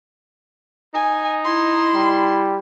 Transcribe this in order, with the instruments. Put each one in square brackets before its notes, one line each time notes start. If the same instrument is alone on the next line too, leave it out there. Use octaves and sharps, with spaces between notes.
[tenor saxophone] D#4 [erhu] G#5
[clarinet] E4 [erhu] C6
[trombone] G3